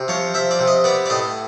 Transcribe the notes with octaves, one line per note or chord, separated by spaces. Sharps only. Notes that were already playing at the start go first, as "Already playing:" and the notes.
Already playing: C3
F3 C#5
F3 E5
D5
C3
D#5
B3 D5
D5
A2 D#5